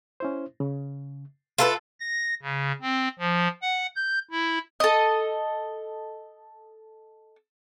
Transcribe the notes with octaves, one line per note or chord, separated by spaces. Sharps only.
C#4 E4 C5
C#3
F4 A4 B4 E5 F5
A#6
C#3
C4
F3
F#5
G6
E4
A4 D#5